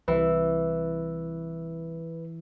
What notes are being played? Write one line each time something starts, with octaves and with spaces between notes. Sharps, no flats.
C2 E3 B4